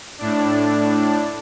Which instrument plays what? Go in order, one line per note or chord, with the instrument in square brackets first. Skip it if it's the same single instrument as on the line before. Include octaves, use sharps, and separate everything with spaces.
[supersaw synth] A2 D4